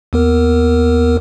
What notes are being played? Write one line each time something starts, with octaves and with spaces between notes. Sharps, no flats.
D#2 B3 A#4